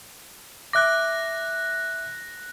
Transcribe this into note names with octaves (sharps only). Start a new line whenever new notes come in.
E5 D6 F#6 A#6